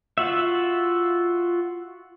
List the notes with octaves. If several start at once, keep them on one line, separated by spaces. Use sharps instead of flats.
F4 F#4 E5